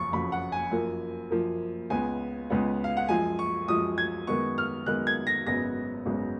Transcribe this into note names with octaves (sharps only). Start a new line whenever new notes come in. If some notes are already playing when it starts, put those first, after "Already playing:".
Already playing: F#1 F2 C#3 C#6
F#1 F2 C#3 F#3 B5
F#5
G#5
F#2 F3 A#3
F#2 F3 A#3
C#2 C#3 G#3 B3 G#5
C#2 C#3 G#3 B3
F5
F#5
F#2 F3 G#3 G#5
C#6
F#2 F3 G#3 D#6
G#6
F#2 D#3 G#3 B3 C#6
F6
F#2 D#3 G#3 B3 F#6
G#6
A#6
G#1 F#2 C#3 G#3 B3 A#6
G#1 F#2 C#3 G#3 B3